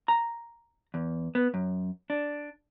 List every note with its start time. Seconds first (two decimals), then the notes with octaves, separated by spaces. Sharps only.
0.08 A#5
0.94 E2
1.35 B3
1.54 F#2
2.10 D4